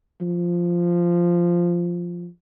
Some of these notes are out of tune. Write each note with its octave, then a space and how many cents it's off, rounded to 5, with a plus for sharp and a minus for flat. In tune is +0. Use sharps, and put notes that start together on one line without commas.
F3 -5